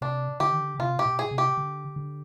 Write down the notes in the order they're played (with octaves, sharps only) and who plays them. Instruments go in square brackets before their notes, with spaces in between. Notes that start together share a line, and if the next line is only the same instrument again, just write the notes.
[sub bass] C3 [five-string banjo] D4
[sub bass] D3 [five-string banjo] G4
[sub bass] D#3
D3
[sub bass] C3 [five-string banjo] F4
[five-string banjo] G4
[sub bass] B2
[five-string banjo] G#4
[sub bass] C3
[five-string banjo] G4
[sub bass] D3
D3